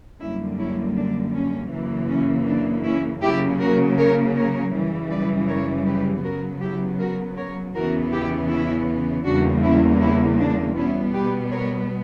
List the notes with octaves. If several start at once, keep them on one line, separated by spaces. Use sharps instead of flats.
F#2 D3 G3 A#3 C#4 E4
C#4 E4
D4
C#4
F#2 C#3 E3 A#3
C#4
D4
C#4 E4
C#3 F#3 A#3 E4 G4
F#4 A#4
A#4 C#5
A#4 C#5
F#2 C#3 E3 G3
B4 D5
A#4 C#5
G4 B4
C#3 F#3 B3 F#4 A#4
E4 G4
F#4 A#4
A#4 C#5
E2 C#3 E3 B3 F#4 A#4
E4 G4
C#4 E4
E2 C#3 G3 A#3 D4 F#4
C#4 E4
C#4 E4
D4
B2 G3 B3 C#4 E4
G4 B4
A#4 C#5